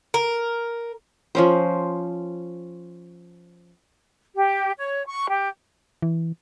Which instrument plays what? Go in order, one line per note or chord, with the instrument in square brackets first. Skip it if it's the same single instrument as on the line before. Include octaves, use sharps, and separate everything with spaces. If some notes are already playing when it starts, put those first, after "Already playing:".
[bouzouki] A#4
[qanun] F3 C#4 C5
[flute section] G4
C#5
C#6
G4
[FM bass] E3